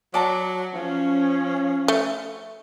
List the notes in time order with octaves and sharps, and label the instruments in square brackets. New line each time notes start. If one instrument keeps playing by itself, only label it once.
[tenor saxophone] F#3 [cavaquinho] D5 A5 A#5
[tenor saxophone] F3 [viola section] C#4
[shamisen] A3